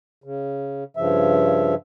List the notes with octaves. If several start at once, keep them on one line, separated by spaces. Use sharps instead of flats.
C#3
G2 C#3 F3 E5